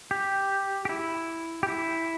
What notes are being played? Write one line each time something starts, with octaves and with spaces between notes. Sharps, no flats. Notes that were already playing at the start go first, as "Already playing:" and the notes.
G4
G4
E4
G4
E4